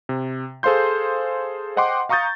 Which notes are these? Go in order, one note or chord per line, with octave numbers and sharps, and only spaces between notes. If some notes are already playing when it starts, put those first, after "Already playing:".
C3
G#4 A4 C5 F5 C6 G6
C5 D#5 F#5 G5 C6 D6
F5 A#5 C#6 D#6 G6 A6